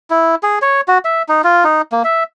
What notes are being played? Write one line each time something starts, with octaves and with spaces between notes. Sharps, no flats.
E4
G#4
C#5
F#4
E5
D#4
F4
D#4
A#3
E5